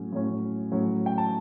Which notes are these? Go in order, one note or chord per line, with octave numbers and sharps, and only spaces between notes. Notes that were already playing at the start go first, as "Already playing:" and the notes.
Already playing: A2 F#3 C#4
A2 F#3 C#4
A2 F#3 C#4
G5
A5